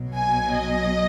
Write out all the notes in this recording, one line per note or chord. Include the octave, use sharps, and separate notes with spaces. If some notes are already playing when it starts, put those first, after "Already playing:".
Already playing: B1 B2 F#3
G#5
D#5